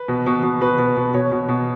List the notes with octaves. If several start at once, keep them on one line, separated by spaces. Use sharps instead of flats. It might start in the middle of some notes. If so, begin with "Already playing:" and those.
Already playing: B4
B2
B2
B2
B2 B4
B2
B2
B2 C#5
B2
B2